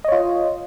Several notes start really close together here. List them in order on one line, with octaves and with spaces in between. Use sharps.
D#5 C#5 F4